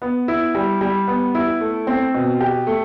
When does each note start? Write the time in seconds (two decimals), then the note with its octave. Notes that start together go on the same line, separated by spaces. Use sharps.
0.02 B3
0.28 E4
0.55 G3
0.81 G3
1.08 B3
1.35 E4
1.61 A3
1.87 C4
2.14 B2
2.41 G4
2.67 A3